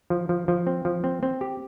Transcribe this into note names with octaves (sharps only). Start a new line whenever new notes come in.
F3
F3
F3
C4
F3
C4
C4
G4